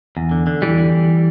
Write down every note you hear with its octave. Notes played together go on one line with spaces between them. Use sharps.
E2
D3
D3
E2 E3 G3
D3
E2